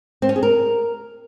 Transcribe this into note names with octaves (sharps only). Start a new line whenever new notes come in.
C4
C#4
G#4
A#4